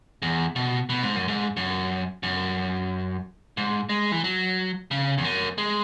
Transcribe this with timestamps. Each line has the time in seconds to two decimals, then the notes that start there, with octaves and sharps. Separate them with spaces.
0.22 E2
0.56 B2
0.89 B2
1.03 G#2
1.16 F#2
1.28 G#2
1.57 F#2
2.23 F#2
3.57 G#2
3.89 G#3
4.12 E3
4.24 F#3
4.91 C#3
5.18 E2
5.24 F#2
5.58 G#3